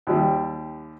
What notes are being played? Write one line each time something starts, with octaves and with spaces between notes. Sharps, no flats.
D#2 G3